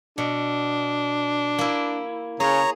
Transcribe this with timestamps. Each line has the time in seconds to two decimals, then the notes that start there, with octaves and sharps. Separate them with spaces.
0.18 B2 D4
1.59 A#3 E4
2.40 C#3 G#4 C#5 A#5